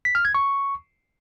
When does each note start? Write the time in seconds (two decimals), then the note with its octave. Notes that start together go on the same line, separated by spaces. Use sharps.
0.05 B6
0.15 F6
0.25 G#6
0.35 C#6